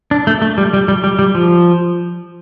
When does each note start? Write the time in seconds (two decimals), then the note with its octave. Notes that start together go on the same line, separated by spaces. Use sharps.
0.11 D4
0.27 A3
0.42 A3
0.58 G3
0.73 G3
0.88 G3
1.04 G3
1.19 G3
1.35 F3